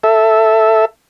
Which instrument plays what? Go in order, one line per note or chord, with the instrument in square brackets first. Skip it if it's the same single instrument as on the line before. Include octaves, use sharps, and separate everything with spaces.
[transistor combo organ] A4 E5